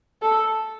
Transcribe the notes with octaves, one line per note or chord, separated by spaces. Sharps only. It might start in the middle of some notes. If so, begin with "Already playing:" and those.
A4